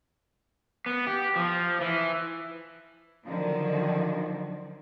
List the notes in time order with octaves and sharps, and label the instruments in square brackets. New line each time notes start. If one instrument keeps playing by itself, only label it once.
[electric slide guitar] B3
G4
F3
E3
[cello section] D3 D#3 F3 F#3